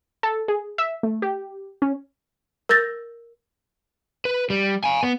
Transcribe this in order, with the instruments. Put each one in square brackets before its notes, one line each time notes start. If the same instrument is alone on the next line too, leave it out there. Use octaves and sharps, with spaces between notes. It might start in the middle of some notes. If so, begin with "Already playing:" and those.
[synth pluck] A4
G#4
E5
A3
G4
C#4
[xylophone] A#4 E6 G6 A6 A#6
[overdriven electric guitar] B4
G3
F5 G#5
B3